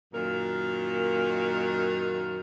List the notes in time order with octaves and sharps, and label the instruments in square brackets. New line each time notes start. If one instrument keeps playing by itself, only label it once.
[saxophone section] F#2 A#2 D#3 A#4